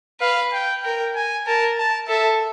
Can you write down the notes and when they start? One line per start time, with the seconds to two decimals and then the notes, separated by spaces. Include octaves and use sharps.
0.21 B4 F5
0.53 G5
0.83 A#4 G5
1.15 G#5
1.47 A#4 A5
1.78 A5
2.09 A4 E5